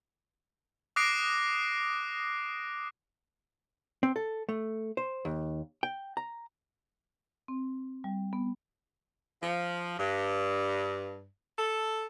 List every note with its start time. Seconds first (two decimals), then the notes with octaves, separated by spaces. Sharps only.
0.96 D6 D#6 F#6 A#6 C7 D7
4.03 C4
4.16 A4
4.49 A3
4.97 C5
5.25 D#2
5.83 G5
6.17 A#5
7.48 C4
8.04 G3
8.33 B3
9.41 F3
9.98 G2
11.58 A4